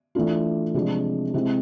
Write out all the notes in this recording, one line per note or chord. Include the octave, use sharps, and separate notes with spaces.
E3 A3 D4 F4
C3 F3 G#3 D4
C3 G#3 C4 E4